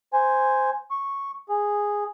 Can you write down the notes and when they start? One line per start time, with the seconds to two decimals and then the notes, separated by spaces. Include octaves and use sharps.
0.13 C5 G#5
0.91 C#6
1.49 G#4